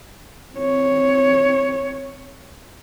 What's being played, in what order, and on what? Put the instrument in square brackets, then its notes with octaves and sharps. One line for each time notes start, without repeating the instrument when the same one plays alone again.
[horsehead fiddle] C4 C#5